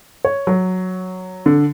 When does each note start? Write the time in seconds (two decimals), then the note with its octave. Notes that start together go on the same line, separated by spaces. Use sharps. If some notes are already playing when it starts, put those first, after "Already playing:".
0.25 C#5
0.47 F#3
1.46 D3